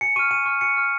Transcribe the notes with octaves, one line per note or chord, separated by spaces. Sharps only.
G#5 C#7
C#6 F6 D#7
G#5 D#7
C#6 F6
G#5 C#7
C#6 F6